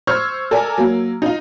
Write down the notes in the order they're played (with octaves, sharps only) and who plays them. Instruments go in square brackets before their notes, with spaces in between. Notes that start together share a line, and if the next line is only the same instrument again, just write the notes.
[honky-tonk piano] C5 C#6 E6 F6 G#6
A4 A#4 D5 G#5
F#3 A#3
D#4 F4